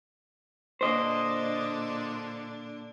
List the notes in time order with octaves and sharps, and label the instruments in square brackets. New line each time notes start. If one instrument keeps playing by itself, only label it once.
[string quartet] A#2 D3 D4 [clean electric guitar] C5 D#5